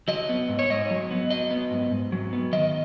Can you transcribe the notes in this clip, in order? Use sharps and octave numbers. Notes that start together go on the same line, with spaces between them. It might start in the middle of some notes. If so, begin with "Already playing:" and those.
F#3 D#5
B3
G#2
C#5
G#2 D#5
F#3
B3
F#3 D#5
B3
G#2
G#2
F#3
B3
D#3 D#5